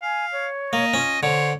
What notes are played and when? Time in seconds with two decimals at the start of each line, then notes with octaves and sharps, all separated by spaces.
0.03 F5 G#5
0.32 C#5
0.73 A#3 D#5
0.94 C#4 F4
1.23 D3 C5 C#5